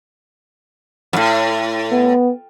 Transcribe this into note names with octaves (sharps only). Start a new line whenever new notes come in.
F2 A2
B3